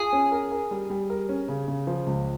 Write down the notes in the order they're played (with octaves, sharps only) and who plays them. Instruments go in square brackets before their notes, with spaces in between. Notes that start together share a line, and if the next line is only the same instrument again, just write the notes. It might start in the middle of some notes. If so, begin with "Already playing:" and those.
Already playing: [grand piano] F4 [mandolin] G#4
[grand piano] C#4
A#4
A#4
G3
G3
A#4
C#4
C#3
C#3
F3
C#2